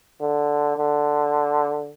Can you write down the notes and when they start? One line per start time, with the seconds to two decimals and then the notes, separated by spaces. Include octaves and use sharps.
0.20 D3
0.77 D3